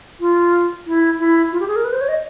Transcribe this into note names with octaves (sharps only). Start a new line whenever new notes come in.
F4
E4
E4
F4
G4
G#4
A#4
B4
C5
C#5
D#5